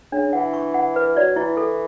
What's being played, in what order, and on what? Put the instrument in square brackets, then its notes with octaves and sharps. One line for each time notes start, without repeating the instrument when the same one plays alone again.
[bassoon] C#3 [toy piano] D4
[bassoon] E3 [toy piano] F#5
[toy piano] C#6
F#5
B4
[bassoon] F#3 [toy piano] D5
[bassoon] E3 [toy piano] E4
[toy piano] A4